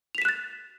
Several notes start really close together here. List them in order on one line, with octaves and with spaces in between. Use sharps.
F7 B6 E7 F#6 A6